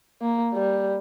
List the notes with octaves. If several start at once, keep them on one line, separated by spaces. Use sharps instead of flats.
A#3
G3